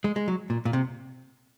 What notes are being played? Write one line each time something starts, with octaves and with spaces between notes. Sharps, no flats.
G#3
G#3
F#3
A#2
A#2
C3